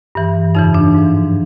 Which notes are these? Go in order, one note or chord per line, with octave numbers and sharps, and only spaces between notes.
G2 E3
F2 C#3 E3 D#4
D4
G#2 F3